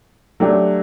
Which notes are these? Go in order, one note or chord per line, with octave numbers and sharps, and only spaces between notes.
F#3 A3 D4 G4